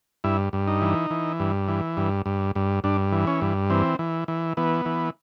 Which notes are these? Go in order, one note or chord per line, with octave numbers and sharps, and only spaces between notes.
G2 E4
G2
D#4
E3
E3
G2
E3
G2
G2
G2
G2 D4
E3
C#4
G2
E3 C4
E3
E3
E3 B3
E3